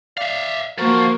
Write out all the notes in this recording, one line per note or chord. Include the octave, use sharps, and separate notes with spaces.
D5 E5 F5
F3 A#3 F#4 A#4